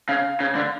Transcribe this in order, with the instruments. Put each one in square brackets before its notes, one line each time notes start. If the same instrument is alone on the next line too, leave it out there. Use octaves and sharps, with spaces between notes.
[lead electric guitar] C#3 [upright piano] F5
[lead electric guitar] C#3
D3